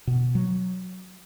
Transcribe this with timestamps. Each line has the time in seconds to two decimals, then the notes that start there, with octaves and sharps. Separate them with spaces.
0.07 B2
0.35 F#3